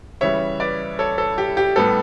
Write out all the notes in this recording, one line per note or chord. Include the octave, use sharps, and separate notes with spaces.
C#3 E3 G3 C#5 E5
B4 D5
A4 C#5
A4
G4
G4
A2 G3 B3 A4